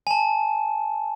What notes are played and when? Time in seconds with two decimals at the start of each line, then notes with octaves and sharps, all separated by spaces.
0.07 G#5 A5